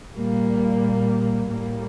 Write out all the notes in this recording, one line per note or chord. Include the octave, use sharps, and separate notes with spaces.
A#2 G3 A#3
A2 G3 A#3